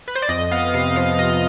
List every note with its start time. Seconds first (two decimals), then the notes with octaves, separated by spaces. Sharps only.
0.08 B4
0.15 C5
0.22 D5
0.29 F2 D#5
0.51 B3 F5
0.74 C3 F5
0.96 F3 F5
1.19 C3 D#5